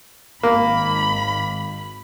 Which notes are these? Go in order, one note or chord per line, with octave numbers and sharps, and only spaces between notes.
G#1 A#3 B5